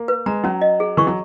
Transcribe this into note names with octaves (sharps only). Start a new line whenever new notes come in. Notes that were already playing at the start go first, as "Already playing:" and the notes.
Already playing: A#3
B4
G#3 A#5
F#3 C#4
D#5
G#4
E3 C#6
F#3